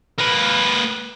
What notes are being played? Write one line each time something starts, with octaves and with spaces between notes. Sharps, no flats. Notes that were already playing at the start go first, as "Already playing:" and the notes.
A#3 B4